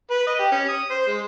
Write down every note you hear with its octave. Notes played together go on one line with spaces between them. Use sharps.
B4
D#5
G4
C#4
D#6
C5
G#3